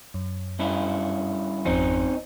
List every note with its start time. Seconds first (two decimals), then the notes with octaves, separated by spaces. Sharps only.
0.14 F#2
0.59 G2 C#4 E4
1.65 G#1 F2 F3 C4 C#4 D#4